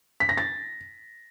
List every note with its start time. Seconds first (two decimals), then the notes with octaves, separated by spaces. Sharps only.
0.20 B6
0.29 A#6
0.37 A6